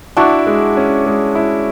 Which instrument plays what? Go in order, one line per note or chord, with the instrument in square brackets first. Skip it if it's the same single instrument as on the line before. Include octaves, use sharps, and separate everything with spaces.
[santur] D4 F#4 [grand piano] E4
[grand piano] G#3
C#4
G#3
E4